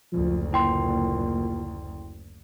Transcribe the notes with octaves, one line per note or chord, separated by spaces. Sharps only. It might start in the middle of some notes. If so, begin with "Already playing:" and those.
F#1 D2 F3
A#2 E4 G5 C6